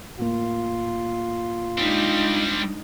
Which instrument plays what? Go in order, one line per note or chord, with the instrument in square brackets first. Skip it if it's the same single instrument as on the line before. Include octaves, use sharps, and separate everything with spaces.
[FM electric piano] A2 A#3 [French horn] F4
[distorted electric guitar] G3 C4 [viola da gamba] G#3 D4 D#4